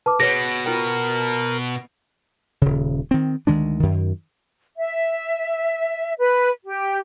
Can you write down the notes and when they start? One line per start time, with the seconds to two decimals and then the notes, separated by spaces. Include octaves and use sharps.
0.06 B4 A5 D6
0.20 B2 G#4 B4 C#5 A#6
0.66 F4 A#4 G5
2.62 D#1 C#3
3.11 D#3 C4
3.47 D2 D#3 G#3 D4
3.80 F#2 D#3
4.76 E5
6.18 B4
6.65 G4